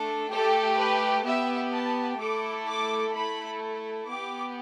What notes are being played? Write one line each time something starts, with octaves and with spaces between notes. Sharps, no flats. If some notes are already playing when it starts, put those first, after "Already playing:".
Already playing: A3 D4 A4
A3 G4 A4
B4
B3 G4 E5
A5
A3 E4 A4 D6
D6
A3 E4 A4 B5
B3 G4 D6